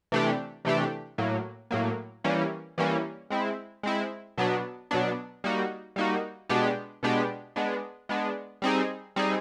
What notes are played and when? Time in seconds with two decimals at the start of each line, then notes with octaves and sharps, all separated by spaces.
0.12 C3 E3 A3 D4 G4
0.65 C3 E3 A3 D4 G4
1.18 A2 F#3 A#3
1.71 A2 F#3 A#3
2.24 E3 G3 A#3 C#4
2.78 E3 G3 A#3 C#4
3.30 G#3 C4 E4
3.83 G#3 C4 E4
4.38 B2 F#3 B3 D4
4.91 B2 F#3 B3 D4
5.44 G3 A#3 D#4 F#4
5.96 G3 A#3 D#4 F#4
6.49 B2 G#3 B3 D4 G4
7.03 B2 G#3 B3 D4 G4
7.56 G#3 B3 D4
8.09 G#3 B3 D4
8.62 G3 C4 D#4 G#4
9.16 G3 C4 D#4 G#4